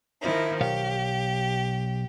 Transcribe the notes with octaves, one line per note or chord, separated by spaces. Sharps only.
D#3 F3 E4
B1 G4 C#5 F5